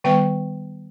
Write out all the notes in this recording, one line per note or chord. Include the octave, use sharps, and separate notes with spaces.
D#3 G3 B3 G5